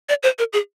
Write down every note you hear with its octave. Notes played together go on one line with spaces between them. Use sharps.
D5
C5
A#4
G#4